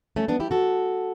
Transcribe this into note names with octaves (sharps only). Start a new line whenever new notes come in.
A3 C#4
B3 D4
E4 G4
F#4 A4